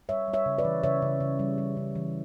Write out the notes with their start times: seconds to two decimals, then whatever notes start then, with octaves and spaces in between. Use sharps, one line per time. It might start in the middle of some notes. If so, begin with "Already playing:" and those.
0.09 G3 C#5 E5
0.28 G3
0.33 C#5 E5
0.46 C#3
0.58 B4 D5
0.65 E3
0.83 C#3 C#5 E5
1.02 C#3
1.20 C#3
1.39 G3
1.58 G3
1.77 C#3
1.95 E3